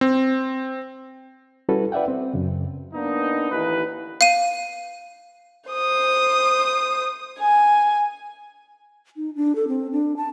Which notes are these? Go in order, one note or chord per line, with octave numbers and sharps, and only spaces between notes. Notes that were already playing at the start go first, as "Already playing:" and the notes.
C4
G3 C#4 E4 F#4 A4 B4
B4 D5 E5 F#5 G5
C4
F#2 C#3
A#3 B3 D4 D#4
A1 D#2 E3 D#4 B4
F5 D#7
C5 D#6
G#5
D#4
D4
A4
C4
D4
A5